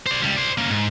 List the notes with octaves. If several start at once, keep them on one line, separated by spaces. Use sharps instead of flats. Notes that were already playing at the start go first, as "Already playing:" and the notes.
C5 D5
C#2 G3
C5 D5
A#3 C#4
G#2